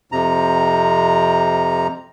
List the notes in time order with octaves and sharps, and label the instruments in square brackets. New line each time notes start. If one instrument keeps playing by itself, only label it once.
[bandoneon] F2 C3 A#5